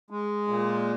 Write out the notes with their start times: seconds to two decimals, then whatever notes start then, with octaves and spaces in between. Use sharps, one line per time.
0.11 G#3
0.48 A#2